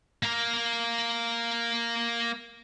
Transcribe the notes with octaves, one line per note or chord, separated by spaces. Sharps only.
A#3 A#4